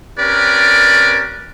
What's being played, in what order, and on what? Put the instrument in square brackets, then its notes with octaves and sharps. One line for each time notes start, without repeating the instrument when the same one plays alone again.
[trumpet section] C4 C#4 G4 A#4 B4 D5